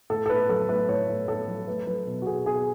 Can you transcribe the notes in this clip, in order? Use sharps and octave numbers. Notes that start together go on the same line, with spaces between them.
A2 A4
A4
A2 B4
F#3 A4
A3 B4
A2 C#5
A2
A2 A4
F#3
A3 B4
F#3 B4
B2
F#4
B2 G#4
B2 G#4